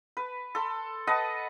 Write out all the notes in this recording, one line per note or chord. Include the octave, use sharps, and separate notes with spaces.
B4
A4 C6
B4 D#5 F#5 A5